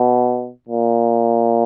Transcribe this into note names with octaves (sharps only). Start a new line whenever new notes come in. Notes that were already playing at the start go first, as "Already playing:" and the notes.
Already playing: B2
A#2